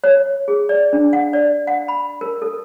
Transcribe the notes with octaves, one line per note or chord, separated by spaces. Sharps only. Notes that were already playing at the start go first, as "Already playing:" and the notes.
C#5
G#4
D5
D4
F#5
D5
F#5
B5
A#4
A4